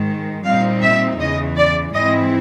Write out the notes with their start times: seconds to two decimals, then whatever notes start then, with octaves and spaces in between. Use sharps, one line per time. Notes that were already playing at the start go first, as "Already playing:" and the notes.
Already playing: G#2 D#3 G#3
0.46 A#2 G3 C4 D#4 F5
0.82 E5
1.20 E2 C#3 E3 D#5
1.57 D5
1.94 G#2 E3 G#3 C4 E4 D#5